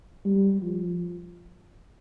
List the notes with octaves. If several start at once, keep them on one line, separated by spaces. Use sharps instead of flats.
G3
F3